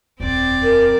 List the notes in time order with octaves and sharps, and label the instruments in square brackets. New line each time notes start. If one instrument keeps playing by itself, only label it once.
[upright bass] D#1 F2 [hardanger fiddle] C4 D5
[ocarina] A#4